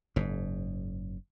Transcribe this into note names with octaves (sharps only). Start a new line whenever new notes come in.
F#1 G#2